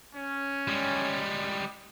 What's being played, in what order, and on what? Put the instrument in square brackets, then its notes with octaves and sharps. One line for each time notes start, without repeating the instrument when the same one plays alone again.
[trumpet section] C#4
[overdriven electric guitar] G3 G#3